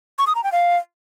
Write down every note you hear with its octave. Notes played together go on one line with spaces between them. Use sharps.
C#6
D#6
A#5
G5
F5